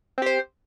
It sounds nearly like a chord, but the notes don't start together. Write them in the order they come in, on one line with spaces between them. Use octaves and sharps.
C4 G4 C5